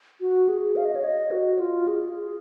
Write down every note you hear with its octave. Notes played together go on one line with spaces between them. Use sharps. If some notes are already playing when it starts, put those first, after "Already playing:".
F#4
G#4
F5
D#5
C#5
D#5
F#4
F4
G#4